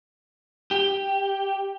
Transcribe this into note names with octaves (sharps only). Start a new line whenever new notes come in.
G4